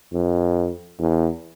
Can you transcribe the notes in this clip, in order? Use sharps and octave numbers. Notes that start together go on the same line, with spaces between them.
F2
E2